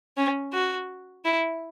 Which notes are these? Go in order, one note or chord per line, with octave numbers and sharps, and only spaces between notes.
C#4
F#4
E4